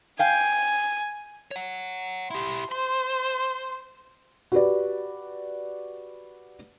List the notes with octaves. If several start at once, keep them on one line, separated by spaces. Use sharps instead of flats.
F5 G5 G#5
C#5 F#5
E4 G4 C6
C5 C6
F#4 G4 B4 D5